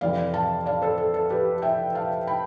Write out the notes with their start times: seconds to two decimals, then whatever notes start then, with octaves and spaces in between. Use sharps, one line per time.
0.01 F2 C3 E3 D5 F5
0.34 F5 A5
0.66 D5 F5
0.82 A4 C5
0.98 A4
1.14 A4
1.30 G4 B4
1.62 E5 G5
1.95 F5 A5
2.27 G5 B5